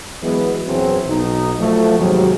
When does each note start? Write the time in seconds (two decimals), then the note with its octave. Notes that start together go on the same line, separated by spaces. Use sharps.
0.23 E3 F#3 G#3 B3
0.67 A#1 E2 E3 F#3 C4 G#4
1.08 B1 D#4
1.58 F3 F#3 A3
1.98 D#2 G#2 C3 F#3